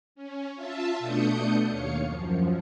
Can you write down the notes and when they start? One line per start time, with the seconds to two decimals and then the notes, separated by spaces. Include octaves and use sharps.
0.15 C#4
0.55 F4 E5 A5
0.99 B2 A3 D4 D#6 G6 C#7
1.70 D#2 C#5 F5 C#7
2.03 F#2 F3